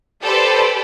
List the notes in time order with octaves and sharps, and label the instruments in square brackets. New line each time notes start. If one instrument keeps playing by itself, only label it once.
[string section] G4 A4 B4 C5 D5